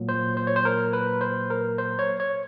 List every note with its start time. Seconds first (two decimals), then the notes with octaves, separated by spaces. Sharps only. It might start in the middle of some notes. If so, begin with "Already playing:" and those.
Already playing: A#2 F#3 A#3
0.09 C5
0.37 C5
0.47 C#5
0.56 C5
0.65 A#4
0.93 B4
1.21 C5
1.50 A#4
1.78 C5
1.99 C#5
2.20 C#5